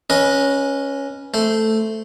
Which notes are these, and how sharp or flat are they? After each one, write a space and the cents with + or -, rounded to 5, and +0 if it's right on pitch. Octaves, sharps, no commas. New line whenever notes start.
C#4 +0 B4 -25 D#5 +0
A3 +0 C5 -15